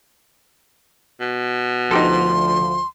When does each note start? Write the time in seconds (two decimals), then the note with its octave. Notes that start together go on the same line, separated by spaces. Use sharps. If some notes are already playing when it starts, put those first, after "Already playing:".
1.20 B2
1.91 D2 F3 D#4 G4 A4 C6